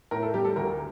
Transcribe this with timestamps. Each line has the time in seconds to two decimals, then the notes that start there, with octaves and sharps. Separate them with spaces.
0.11 A2 A#4
0.22 A4
0.34 G3 G4
0.44 A4
0.56 D2 A#4